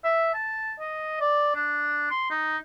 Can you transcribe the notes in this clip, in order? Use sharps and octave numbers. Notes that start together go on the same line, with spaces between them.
E5
A5
D#5
D5
D4
C6
D#4